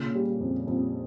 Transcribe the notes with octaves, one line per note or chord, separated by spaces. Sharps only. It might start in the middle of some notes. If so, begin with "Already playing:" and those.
Already playing: A#2 C#3
G3
F2
F2